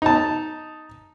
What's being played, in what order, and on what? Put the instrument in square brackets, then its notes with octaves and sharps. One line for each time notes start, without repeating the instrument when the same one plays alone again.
[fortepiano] D#4 A5